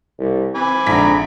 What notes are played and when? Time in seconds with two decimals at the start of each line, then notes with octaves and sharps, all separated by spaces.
0.19 C2
0.55 C4 G#5 B5 D6
0.86 A#1 G#2 D3 A#5 B6